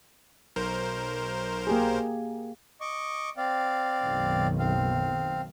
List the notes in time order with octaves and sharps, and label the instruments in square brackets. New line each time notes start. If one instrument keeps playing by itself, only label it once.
[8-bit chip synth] B1 A#4 C5
[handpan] A#3 G4 G#4
[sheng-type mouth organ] D#5 C#6 D6
C4 D5 F5
[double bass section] F#1 B1 D#3
[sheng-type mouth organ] C4 F5